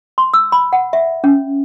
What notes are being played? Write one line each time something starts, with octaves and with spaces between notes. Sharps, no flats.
C6
E6
B5
F#5
E5
C#4